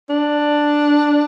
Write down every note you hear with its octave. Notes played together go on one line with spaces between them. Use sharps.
D4